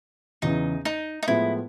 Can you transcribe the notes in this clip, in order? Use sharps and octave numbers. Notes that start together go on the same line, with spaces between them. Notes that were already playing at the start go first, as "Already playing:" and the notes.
E2 C#3 E3 D#4
D#4
D#4
A2 F3 G#3 B3 E4